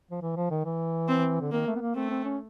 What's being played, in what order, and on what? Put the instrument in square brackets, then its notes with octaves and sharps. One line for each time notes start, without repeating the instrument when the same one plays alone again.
[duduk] F3
E3
F3
D#3
E3
[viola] C4
[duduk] D3
[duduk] D#3 [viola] A#3
[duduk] A3
B3
A#3
[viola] A3 [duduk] C4
[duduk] C4
C#4